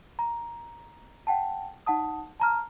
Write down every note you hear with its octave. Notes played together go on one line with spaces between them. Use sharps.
A#5
F#5 G5 A5
D#4 F#5 A5 D#6
A5 A#5 F6